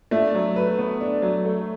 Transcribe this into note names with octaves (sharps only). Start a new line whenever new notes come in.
A3 D4
F#3
B4
B3
D4
F#3
A3